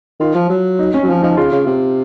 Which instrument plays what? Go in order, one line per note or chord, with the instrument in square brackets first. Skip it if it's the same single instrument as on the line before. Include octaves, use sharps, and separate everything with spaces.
[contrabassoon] D#3 [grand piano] F4
[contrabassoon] F3
F#3
[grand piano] D#4
C#4
[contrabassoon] F#3
[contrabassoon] F3 [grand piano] C#4
[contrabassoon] F3 [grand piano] D#4
[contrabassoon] C#3 [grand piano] F4
[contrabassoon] C#3
C3